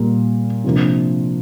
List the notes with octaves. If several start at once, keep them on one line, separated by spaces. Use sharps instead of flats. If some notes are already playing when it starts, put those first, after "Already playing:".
Already playing: A#2 G3 A#3
C3 F3 A#3 D4